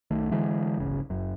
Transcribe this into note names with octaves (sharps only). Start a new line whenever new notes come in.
B1 D#3 A3
D3 E3 G#3
D1 G1 C#3
F#1 F#2